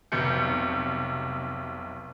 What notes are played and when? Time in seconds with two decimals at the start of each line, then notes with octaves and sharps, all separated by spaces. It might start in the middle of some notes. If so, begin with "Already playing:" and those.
0.12 F1 B1 C3 G6 C#7